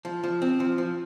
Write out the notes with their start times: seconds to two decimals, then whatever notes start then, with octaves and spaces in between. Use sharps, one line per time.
0.05 F3
0.24 F3
0.42 C4
0.60 F3
0.78 F3